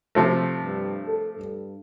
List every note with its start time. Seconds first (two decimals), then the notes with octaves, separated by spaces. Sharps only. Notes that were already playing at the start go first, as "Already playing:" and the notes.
0.15 C3 F3 A3
0.62 G2
1.08 A4
1.39 G2